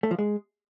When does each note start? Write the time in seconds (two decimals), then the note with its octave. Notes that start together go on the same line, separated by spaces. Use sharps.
0.03 A3
0.11 F3
0.19 G#3